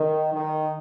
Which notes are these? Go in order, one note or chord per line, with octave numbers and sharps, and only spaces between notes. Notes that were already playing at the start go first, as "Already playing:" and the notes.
Already playing: D#3
D#3